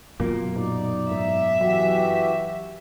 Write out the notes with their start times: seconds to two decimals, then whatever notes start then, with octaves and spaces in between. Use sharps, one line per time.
0.20 F#2 B2 A#3 F4
0.56 A#2 D#4 D5
1.11 G#2 E5
1.61 E3 F#3 F#4 G4